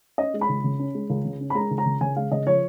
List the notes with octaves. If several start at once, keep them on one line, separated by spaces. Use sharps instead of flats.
C#4 D#5
G#3
B5
C#2
C#3
C#4
G#3
C#2
C#3
C#4
B5
G#3 A#5
C#2
A#5
C#3
C#3 G#5
G#3 F5
C#3 D#5
F3 C#5